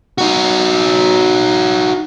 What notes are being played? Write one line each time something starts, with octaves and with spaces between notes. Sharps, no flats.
D#4 F#4